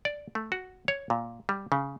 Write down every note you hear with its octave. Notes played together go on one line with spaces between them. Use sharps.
D5
A3
F#4
C#5
A#2
G3
C#3